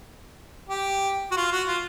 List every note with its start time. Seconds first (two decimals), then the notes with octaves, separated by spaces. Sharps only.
0.69 G4
1.31 F#4
1.37 F4
1.51 F#4
1.68 F4